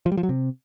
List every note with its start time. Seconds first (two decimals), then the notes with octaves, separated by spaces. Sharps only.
0.06 F3
0.12 G3
0.17 F3
0.23 F#3
0.29 C3